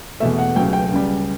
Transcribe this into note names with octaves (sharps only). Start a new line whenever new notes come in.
E2 B2 A3 E5
F#5
C#2 C#3 F#3 A3 G5
G5
C#2 C#3 G3